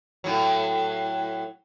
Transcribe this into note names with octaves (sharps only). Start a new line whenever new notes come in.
A2 F#3